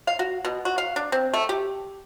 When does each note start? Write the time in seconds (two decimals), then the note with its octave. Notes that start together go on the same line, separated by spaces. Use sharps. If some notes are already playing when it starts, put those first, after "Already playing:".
0.07 F5
0.19 F#4
0.45 B2
0.65 F#4
0.78 F5
0.96 D4
1.12 C4
1.34 A3
1.49 G4